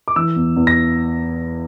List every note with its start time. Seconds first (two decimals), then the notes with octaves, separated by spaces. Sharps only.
0.08 D6
0.16 E3 E6
0.36 E2
0.56 E2
0.67 A#6